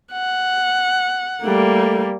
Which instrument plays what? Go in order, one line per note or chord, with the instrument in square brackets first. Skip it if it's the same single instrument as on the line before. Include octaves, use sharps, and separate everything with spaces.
[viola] F#5
[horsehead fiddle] G3 A#3 [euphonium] A3